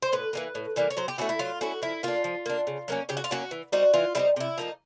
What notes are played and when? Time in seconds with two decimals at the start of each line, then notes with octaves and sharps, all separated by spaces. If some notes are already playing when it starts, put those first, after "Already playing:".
0.02 C5
0.12 A2 B4
0.33 E3 G3 A#3
0.55 A2
0.76 E3 G3 A#3
0.90 C#5
0.97 F#3 C5
1.08 G4
1.18 A3 C#4 E4 F#4
1.29 E4
1.39 F#3 F4
1.61 A3 C#4 E4 F#4
1.82 F3 E4
2.03 A#3 D4 F4
2.24 F3
2.46 A#3 D4
2.67 C#3
2.88 F#3 A#3 C#4
3.09 C#3 G4
3.17 F#4
3.24 F4
3.31 F#3 A#3 C#4 F#4
3.51 E3
3.72 G3 C4 D#4 F#4
3.94 E3 F4
4.15 G3 C4 D#4 E4
4.36 C3 E4
4.58 F3 A#3 D#4